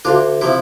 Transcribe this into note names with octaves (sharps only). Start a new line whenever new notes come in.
D2 D4 F4
C3 F3 E4